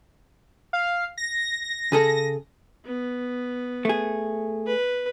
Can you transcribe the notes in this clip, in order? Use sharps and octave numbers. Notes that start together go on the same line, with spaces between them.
F5
A#6
C#3 G#4 A4
B3
A3 G#4
B4